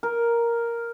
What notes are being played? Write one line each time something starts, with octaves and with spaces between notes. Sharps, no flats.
A#4